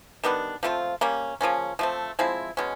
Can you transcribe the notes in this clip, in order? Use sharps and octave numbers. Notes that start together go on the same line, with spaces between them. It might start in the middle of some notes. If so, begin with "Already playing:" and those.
D#3 G3 B3 D4
F3 A3 C4 F4
G3 A#3 C#4
C#3 F3 A#3 C#4
F3 A3 C4
F3 G#3 C4 E4
B2 G#3 C#4